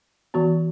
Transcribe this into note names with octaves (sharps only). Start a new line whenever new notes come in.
E3 B3 F#4